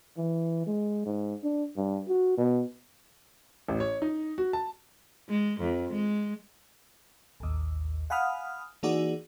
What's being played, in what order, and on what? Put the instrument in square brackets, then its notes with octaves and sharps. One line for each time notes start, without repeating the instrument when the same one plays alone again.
[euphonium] E3
G#3
G#2
D4
G2
F#4
B2
[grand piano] A1
C#5
D#4
F#4
A5
[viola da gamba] G#3
F2
G#3
[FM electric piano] A1 D#2
F5 F#5 G#5 B5 D#6 F6
E3 A#3 D#4 F#4 G#4 D5